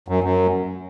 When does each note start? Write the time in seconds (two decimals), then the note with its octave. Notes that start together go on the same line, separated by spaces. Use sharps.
0.08 F#2
0.24 F#2